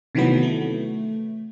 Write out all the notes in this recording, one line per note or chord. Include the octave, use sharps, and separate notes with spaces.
C3 D#3 E3 F#3 A3 B3
A3